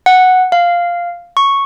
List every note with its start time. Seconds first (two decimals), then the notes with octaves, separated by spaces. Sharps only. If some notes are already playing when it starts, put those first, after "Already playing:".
0.06 F#5
0.52 F5
1.37 C#6